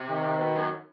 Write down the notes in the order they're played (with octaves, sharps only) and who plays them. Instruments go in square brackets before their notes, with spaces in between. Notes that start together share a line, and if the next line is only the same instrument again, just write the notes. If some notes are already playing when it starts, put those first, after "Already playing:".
Already playing: [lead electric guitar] C3
[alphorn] D#3
[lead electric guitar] B2
F#2